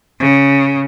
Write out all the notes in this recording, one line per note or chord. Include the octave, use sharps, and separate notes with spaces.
C#3